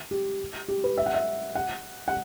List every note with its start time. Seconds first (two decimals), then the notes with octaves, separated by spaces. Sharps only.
0.11 G4
0.68 G4
0.84 B4
0.97 E5
1.06 F#5
1.14 E5
1.55 F#5
2.08 F#5